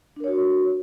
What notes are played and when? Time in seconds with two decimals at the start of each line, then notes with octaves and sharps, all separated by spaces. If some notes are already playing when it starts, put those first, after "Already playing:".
0.16 D4
0.20 A#4
0.24 C#5
0.28 F#4